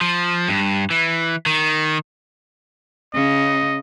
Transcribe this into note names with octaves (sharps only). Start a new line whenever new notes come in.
F3
G2
E3
D#3
C#3 D#5